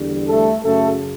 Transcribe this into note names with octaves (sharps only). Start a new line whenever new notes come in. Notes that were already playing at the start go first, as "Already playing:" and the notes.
Already playing: E2 D3 G3
A3 A4
F#2 C#3 F#3 A3 A4